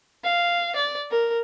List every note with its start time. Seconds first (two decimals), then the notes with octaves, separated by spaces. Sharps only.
0.24 F5
0.76 D5
1.11 A#4